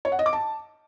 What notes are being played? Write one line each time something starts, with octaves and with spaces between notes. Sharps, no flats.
C#5
F#5
D#5
D6
A5